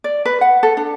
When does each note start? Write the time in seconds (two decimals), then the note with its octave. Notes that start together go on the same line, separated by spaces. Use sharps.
0.04 D5
0.25 B4
0.41 F#5
0.63 A4
0.77 D4